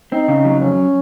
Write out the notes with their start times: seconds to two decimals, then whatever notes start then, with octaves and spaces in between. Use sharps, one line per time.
0.12 C4 D#4
0.28 C#3
0.45 F#3
0.61 F2 C#4